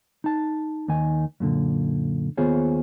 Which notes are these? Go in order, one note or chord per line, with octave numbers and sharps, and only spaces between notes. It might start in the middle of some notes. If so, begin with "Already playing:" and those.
D#4 A5
D#2 D#3 D#4 G#5
F#2 A#2 D3
D#2 B3 F4 G#4 C5 C#5